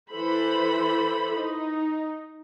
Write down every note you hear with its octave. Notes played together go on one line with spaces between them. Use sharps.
E3 A4 C5 B5
D#4